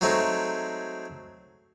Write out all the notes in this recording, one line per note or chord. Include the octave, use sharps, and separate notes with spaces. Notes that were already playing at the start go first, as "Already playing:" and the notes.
F#3 G#3 A3 C4 D#4